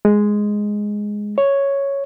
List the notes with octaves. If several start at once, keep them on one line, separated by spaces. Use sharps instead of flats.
G#3
C#5